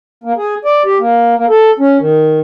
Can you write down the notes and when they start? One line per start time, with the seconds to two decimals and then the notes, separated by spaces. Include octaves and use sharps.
0.24 A#3
0.37 G#4
0.65 D5
0.85 G4
0.99 A#3
1.36 A#3
1.49 A4
1.79 C#4
1.99 D#3